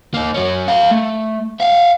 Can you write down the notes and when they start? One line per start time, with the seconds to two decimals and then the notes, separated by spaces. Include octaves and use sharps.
0.14 A#3 D#4
0.34 F#3 C#4
0.68 A4 F5
0.91 A3
1.60 E5 F5